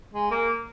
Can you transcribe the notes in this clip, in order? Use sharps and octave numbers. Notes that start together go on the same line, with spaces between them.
G#3
A#3